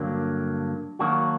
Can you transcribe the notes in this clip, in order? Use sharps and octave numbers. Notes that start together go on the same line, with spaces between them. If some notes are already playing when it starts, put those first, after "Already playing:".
Already playing: G2 D3 F#3 A#3 D4
D#3 F#3 A#3 D4 F#4